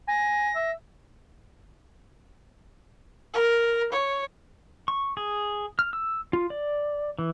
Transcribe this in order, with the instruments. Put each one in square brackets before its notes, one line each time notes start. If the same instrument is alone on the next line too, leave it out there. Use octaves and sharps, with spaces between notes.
[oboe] G#5 [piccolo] A#6
[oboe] E5
[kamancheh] A#4
C#5
[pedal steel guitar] C#6
G#4
F6
E6
F4
D5
E3